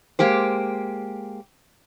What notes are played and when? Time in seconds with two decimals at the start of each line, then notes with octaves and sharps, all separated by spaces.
0.19 G#3 A#3 G4 C5